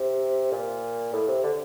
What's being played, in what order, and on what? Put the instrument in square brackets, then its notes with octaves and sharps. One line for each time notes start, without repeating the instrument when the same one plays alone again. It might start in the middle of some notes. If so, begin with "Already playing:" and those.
Already playing: [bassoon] C3
A#2
A2
C3
D3